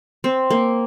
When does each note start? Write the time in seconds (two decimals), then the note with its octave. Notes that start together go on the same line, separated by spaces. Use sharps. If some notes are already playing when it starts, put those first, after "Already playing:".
0.24 C4
0.50 A#3